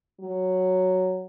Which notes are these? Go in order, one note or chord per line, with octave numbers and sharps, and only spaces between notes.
F#3